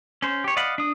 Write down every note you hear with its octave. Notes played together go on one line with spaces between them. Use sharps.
C#4 C5
G4 C#5
D5 D#5 F5 F#5 B5
D4 D#6